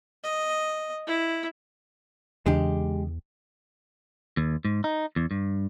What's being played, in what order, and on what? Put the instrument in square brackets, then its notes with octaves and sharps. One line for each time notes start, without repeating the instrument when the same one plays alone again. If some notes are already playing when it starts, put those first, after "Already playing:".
[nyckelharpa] D#5
E4
[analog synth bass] E2 [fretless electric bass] C#3 E3 D4 [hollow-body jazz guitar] G#3 G4
[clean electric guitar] D#2
G#2
D#4
E2
G2